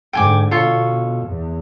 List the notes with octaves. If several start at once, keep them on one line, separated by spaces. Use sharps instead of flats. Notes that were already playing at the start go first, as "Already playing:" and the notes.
G#2 D3 G5 G#5 D6
B2 F4 A4 C#5
E2